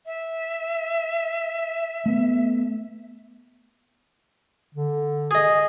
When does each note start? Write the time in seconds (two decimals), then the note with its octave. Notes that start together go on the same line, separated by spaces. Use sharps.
0.06 E5
2.06 A3 B3
4.75 D3
5.31 G#4 D#5